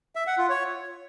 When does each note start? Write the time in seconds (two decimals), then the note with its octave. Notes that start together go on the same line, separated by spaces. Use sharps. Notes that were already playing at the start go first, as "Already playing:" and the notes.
0.16 E5
0.27 F#5
0.38 F4
0.49 C#5